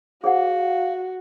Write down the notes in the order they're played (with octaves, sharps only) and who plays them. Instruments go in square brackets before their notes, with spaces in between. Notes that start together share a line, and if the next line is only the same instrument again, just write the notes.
[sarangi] F#4 [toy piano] G#4 C5 F#5 [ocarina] F5